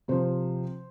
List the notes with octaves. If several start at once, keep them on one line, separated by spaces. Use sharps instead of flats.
C3 F3 C5